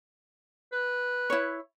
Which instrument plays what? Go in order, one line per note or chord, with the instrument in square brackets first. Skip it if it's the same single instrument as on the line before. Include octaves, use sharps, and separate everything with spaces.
[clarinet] B4
[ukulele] E4 C#5